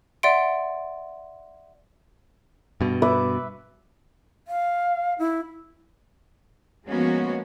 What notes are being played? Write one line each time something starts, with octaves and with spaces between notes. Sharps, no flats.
D5 E5 F#5 C6 D7
G2 B2
B4 E5 D6
F5
E4
F3 G#3 A#3 B3 C#4 F#4